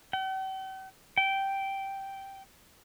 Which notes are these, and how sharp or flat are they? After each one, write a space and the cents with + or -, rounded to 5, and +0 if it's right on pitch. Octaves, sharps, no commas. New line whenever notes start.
G5 -45
G5 -10